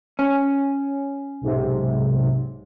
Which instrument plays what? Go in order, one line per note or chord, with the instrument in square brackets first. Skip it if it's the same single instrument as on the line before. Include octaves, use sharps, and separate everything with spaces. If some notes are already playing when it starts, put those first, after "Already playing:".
[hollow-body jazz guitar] C#4
[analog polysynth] B1 G#2 C3